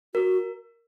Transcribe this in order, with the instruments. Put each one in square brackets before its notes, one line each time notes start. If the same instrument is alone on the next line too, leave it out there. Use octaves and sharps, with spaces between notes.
[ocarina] F#4 [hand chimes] A#4